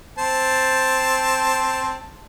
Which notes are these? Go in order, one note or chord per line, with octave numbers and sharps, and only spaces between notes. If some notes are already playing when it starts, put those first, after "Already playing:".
C4 C5 A5